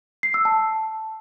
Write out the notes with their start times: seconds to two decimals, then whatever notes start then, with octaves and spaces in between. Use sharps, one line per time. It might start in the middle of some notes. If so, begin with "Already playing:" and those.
0.23 C7
0.34 E6
0.45 A5